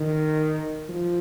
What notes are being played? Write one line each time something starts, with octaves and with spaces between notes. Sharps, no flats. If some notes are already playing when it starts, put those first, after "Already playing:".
Already playing: D#3
F3